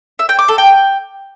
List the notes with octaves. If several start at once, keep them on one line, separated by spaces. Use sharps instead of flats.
E5
G5
D6
A4
G5